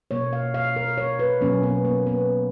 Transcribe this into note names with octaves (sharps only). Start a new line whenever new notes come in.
B2 A#3 C#5
F5
F5
A#4
C#5
B4
B2 F#3 A#3 C#4
B3
A#3
B3